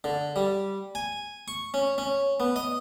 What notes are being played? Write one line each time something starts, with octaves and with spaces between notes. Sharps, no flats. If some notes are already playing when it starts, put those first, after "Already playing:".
D3
G3
G#5
C#6
C#4
C#4
B3
D#5